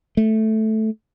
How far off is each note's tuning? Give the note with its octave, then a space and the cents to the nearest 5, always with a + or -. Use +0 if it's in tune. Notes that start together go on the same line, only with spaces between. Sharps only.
A3 -5